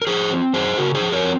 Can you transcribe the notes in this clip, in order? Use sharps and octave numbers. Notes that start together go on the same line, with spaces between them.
A#4
F3 G#4 C5
C4
F#2 G#4 C5
C#3 F#4 A#4
G#4 C5
F3
A#4 C#5
C4